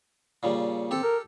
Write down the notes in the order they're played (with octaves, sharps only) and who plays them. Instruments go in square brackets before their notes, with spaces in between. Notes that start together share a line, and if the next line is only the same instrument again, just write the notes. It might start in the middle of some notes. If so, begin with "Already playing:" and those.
[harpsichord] A#2 C#3 G3
[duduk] C4 [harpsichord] G4 A4
[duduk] A#4